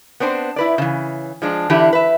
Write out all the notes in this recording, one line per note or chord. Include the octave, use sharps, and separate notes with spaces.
B3 C4 D4 C5
E4 B4 D5
C#3 E3
F3 G#3 D4
D3 E3 D4 E4 G4
B4 E5